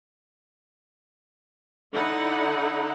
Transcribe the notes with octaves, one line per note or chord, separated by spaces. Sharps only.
D3 D#4 E4 F#5